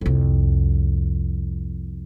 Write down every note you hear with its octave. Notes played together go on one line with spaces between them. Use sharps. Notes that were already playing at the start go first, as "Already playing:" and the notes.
C2 F2